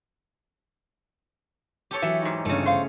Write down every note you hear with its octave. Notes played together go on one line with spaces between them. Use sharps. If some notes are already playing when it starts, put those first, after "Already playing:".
G4 A4 C#5
E3 F#3 E5
G#2 D#4
G1 C#3 A3
C5 F5